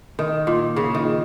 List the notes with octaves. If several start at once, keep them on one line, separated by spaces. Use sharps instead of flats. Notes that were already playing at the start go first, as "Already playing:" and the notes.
D#3
A#2
C#3
D#3